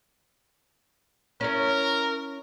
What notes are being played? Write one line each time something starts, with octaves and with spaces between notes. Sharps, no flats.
C#4 E4 A#4 C#5